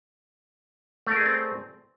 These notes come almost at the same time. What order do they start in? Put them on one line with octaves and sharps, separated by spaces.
A3 A#4 G#4 D5 C4